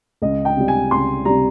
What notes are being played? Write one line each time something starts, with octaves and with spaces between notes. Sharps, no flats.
C#2 D#5
G5
C3 G3
G#5
C#2 C6
C3 G3 A#5